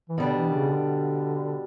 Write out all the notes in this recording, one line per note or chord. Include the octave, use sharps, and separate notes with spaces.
E3
B2 D3 G3 D4
E3
C#3
D3